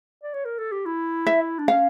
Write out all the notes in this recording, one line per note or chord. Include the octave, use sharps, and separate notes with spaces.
D5
C#5
A#4
A4
G4
E4
E5
D4
C#4 F5